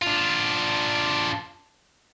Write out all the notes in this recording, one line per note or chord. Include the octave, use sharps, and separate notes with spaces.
D4 F4